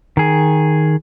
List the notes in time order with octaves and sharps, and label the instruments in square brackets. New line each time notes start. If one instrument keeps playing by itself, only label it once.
[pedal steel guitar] D#3 G#4